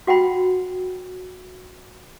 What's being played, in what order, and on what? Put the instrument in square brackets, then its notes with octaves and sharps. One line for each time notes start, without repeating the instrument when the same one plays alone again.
[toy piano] F#4 F#5 G5 B5